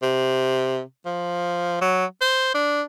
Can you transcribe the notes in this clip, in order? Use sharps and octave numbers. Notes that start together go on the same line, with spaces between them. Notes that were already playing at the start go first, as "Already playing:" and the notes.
C3
F3
F#3
C5
D4